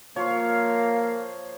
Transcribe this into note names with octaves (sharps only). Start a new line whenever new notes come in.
F3 A#3 C#5 F5